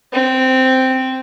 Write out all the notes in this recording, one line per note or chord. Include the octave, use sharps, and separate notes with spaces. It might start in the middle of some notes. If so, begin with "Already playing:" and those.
C4